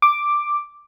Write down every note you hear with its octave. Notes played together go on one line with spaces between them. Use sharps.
D6